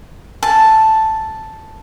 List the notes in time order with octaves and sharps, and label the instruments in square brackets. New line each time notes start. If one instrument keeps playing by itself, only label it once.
[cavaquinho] A5